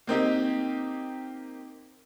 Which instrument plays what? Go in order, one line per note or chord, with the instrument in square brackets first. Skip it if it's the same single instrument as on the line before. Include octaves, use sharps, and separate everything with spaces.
[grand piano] A#3 C4 D#4 G4